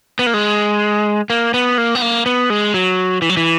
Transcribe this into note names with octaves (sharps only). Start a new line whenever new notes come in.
B3
A#3
G#3
A#3
B3
A#3
B3
A#3
B3
G#3
F#3
E3
F#3
E3